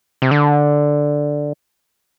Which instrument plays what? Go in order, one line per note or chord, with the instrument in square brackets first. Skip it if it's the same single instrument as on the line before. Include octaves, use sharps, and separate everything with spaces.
[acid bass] C3
D3